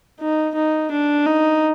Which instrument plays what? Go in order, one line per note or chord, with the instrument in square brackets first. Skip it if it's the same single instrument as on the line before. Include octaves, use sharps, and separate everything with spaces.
[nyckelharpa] D#4
D#4
D4
D#4